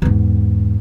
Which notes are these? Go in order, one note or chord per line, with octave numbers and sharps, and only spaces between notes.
E2 G#2